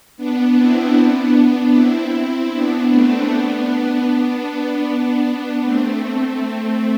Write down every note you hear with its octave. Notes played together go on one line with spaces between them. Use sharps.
B3 D4
C4 E4
B3 D4
C4 E4
B3 D4
A3 C4
B3 D4
B3 D4
B3 D4
B3 D4
A3 C4